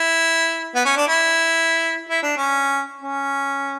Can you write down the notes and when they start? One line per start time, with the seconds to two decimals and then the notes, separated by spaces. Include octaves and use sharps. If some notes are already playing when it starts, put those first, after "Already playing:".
Already playing: E4
0.75 B3
0.85 C#4
0.96 D4
1.08 E4
2.09 E4
2.23 D4
2.37 C#4
3.01 C#4